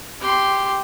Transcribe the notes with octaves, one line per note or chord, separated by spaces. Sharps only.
G4 C6